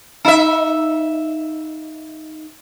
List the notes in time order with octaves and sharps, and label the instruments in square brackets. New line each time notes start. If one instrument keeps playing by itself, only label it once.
[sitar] D#4 E5